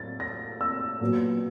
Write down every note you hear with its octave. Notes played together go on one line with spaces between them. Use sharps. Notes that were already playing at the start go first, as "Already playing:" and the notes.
Already playing: A2 F#3 A6
A#6
E6
A#2 F#3 B3